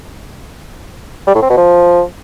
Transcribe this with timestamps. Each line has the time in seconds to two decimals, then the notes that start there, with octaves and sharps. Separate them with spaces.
1.27 G3
1.35 A2
1.42 C4
1.50 B2
1.57 F3